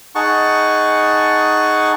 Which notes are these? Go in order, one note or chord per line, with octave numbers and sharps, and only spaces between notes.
D#4 G#4 F#5 A5 C#6